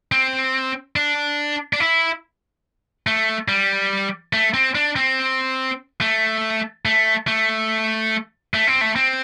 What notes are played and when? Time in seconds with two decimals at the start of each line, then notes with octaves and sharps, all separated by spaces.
0.12 C4
0.96 D4
1.73 D4
1.80 E4
3.07 A3
3.48 G3
4.33 A3
4.54 C4
4.75 D4
4.96 C4
6.01 A3
6.85 A3
7.27 A3
8.54 A3
8.67 C4
8.81 A3
8.96 C4